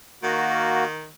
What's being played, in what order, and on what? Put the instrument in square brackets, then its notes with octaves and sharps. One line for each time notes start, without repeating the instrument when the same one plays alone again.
[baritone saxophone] D#3 [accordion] A#3 F#4